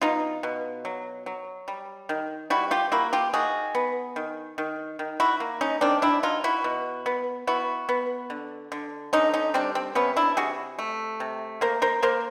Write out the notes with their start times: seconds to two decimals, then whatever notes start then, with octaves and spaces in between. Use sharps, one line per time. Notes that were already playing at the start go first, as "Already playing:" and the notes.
0.02 B2 D#4 F4
0.43 B2
0.85 F#3
1.26 F#3
1.68 G3
2.09 D#3
2.50 G3 E4 F#4
2.71 F4 G4
2.92 A#3 E4 F#4
3.13 F4 G4
3.34 D#3 F#4 G#4
3.75 B3
4.16 D#3
4.58 D#3
4.99 D#3
5.20 E4 F#4
5.40 A#3
5.61 C#4 D#4
5.81 D#3 C4 D4
6.02 D4 E4
6.23 F#3 D#4 F4
6.44 E4 F#4
6.64 B2
7.06 B3
7.47 B3 E4 F#4
7.89 B3
8.30 D3
8.72 D3
9.13 D3 C#4 D#4
9.34 C#4 D#4
9.54 G3 C4 D4
9.75 C4
9.95 C3 B3 C#4
10.16 D4 E4
10.37 C3 F#4 G#4
10.79 A3
11.20 C3
11.61 A#3 A#4 C5
11.82 A#4 C5
12.02 A#3 A#4 C5